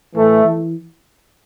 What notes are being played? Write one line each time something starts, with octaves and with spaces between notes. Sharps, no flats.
A2 E3 A3
E3